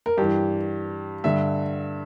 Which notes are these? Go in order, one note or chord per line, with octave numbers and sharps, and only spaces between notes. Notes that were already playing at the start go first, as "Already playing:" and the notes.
A#4
G2 E3 G4
G2 D3 E5